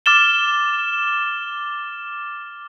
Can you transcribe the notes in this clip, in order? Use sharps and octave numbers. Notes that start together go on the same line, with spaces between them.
D6 F6 A6 E7 G7